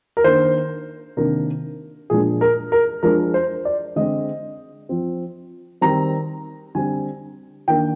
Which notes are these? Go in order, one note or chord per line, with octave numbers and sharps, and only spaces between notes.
A#4
D#3 A#3 D4 C5
C3 D#3 A#3 D4 A#4
A#2 F3 G#3 D4 G#4
A#4
A#4
F3 G#3 D4 A#4
C5
D5
D3 G#3 C4 D#5
F3 C4
D#3 G3 C4 A#5
D3 G3 C4 G#5
D#3 A#3 D4 G5